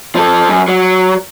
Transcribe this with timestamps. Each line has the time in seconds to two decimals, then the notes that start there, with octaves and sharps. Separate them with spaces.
0.15 F3 A4
0.49 F#2
0.68 F#3